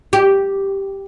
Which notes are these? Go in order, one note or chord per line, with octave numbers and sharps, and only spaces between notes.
G4